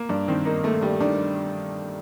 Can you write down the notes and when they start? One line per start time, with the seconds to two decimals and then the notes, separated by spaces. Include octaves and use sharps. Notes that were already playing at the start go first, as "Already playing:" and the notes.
Already playing: A#3
0.09 G2 D4
0.28 D#3 C4
0.45 A#3 D#4
0.63 A3 A#3
0.82 G2 G3
1.00 D#3 D4